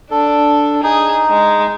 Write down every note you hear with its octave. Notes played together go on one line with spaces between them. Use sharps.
D4 A4
D#4 G#4
G#3